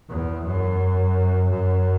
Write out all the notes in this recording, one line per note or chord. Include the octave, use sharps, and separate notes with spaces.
E2
F#2
F#2